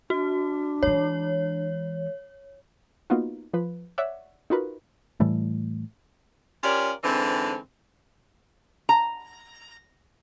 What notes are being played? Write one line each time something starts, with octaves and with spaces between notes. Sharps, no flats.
D4 F#4
E3 G#3 C#5
A#3 B3 D#4 F4 F#4
F3 B4
C#5 D5 E5 F#5
D#4 F4 F#4 A#4 B4
A2 E3 G3 A3
C#4 F4 G4 A#4 C#5 D5
G#2 D3 E3 C4
A#5